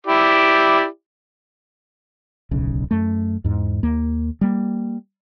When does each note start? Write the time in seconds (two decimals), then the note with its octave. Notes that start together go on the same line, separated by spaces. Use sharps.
0.07 E4 G4 D5
2.51 D1 B1 C#3
2.91 F#2 A3
3.44 E2 G#2
3.83 D#2 A#3
4.41 G3 A#3